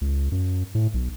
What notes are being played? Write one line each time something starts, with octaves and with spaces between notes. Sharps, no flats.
C#2
F#2
A2
B1